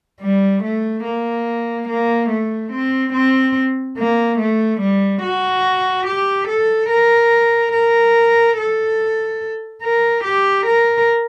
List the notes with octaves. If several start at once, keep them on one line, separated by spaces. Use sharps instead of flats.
G3
A3
A#3
A#3
A3
C4
C4
A#3
A3
G3
F#4
G4
A4
A#4
A#4
A4
A#4
G4
A#4